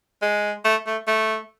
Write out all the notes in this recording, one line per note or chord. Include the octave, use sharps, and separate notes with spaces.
G#3
A3
A3
A3